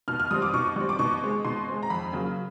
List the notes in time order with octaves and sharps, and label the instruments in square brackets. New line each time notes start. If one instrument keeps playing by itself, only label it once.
[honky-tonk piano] B2 F6
F6
G3 C4 D#6
D6
B2 C#6
G3 C4
D6
B2 C#6
G#3 C4
B2 C6
G#3 C4
A#5
F2 B5
C#3 F#3 A#3